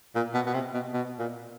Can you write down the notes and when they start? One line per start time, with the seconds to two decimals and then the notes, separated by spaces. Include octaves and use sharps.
0.15 A#2
0.34 B2
0.46 B2
0.54 C3
0.74 B2
0.94 B2
1.19 A#2